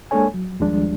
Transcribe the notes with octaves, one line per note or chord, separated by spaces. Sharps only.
G#3 A#3 D4 A4 C#5 G#5
F#3
D#2 F3 G3 G#3 D4